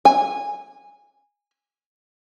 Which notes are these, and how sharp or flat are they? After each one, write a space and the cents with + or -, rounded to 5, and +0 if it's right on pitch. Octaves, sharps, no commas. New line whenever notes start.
G#5 -15